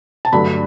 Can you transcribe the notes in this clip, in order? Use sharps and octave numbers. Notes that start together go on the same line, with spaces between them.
A5
G2 D3 F#3 A3 B5